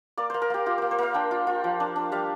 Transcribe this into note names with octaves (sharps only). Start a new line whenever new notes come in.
A#3 D5
A#3 C5
A#4
A#3 G4
F4 G4
A#3 C5
C5
A#3 F5
D4 G5
F4
F4
F3
D4
D4
G3 F5